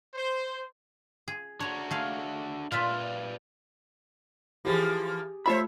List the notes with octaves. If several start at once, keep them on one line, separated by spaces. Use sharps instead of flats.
C5
G#4
D4 F#4 C#5 A#5
A3 G#4 F5
A#2 F4 B4 D5 E5 F5
E3 F3 A#3 G4 G#4
A3 F4 C5 C#5 E5 B5